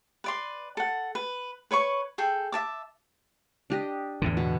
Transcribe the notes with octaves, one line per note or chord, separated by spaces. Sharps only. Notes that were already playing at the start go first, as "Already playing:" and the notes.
B4 D5 C6
A4 F#5
B4
B4 C#5 B5 C#6
G#4 A4 G5
E5 A5 D6
D4 G4 D#5
E2 A2 D3
B2